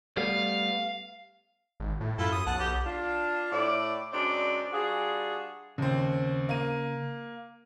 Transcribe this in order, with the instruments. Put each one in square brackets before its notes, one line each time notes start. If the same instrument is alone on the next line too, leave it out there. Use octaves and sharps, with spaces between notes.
[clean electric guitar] G3 A3 B3 [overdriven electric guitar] F5
[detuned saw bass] G#1
A2
[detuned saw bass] F#2 [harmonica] E4 F4 A4
[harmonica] D#6
[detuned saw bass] B1 [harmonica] F#5 A5
[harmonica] G4
[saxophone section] D4 F4
A2 D5
F#2 G#3 C4 D4 D5
G3 D4 F4 F#4 G#4
[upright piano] D#2 C4 [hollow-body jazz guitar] C#3
[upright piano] A#3 D#7